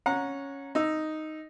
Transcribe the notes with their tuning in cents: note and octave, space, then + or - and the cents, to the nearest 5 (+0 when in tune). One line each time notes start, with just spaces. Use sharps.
C#4 +0 F#5 -25 A#5 +0
D#4 +0 E6 +0